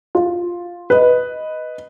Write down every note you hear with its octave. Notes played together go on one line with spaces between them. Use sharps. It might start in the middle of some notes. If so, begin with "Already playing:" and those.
F4
B4 D#5